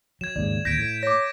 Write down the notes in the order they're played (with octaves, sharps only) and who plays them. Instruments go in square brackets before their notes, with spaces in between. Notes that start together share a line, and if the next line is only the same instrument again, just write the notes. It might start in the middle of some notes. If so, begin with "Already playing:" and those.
[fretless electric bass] F#3 [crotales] G#6 E7
[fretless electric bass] D#2 G#2 C#3 [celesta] D5
[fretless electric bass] D1 D#2 [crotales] G6 B6 D7 [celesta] A#6
[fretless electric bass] A2 [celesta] G#6
[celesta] C#5 D6 [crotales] A#6